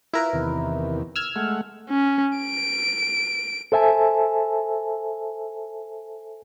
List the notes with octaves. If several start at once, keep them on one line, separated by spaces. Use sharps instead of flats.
E4 F4 A#4 B4
E2 C3 D#3
E6 F6 G#6
G#3 A3 F#5
C#4
D7
A4 C5 E5 G#5 A5